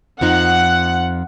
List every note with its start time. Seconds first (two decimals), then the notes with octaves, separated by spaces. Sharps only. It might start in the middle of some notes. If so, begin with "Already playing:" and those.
0.21 F2 F3 D#4 F#5